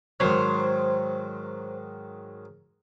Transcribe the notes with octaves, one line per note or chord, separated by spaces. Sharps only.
G#2 D#3 F#3 C5 C#5